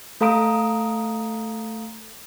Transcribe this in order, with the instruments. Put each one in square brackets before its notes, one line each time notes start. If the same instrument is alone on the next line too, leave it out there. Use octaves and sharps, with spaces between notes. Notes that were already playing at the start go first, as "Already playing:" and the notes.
[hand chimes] A3 A4 F5 A#5 D#6 D7